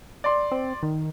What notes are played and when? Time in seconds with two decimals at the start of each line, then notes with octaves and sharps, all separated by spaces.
0.24 D5 C6
0.52 C4
0.83 D#3